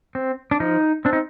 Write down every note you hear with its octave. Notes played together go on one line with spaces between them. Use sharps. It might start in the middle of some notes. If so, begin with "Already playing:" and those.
C4
D4
F3 D#4
C4 D4
D#4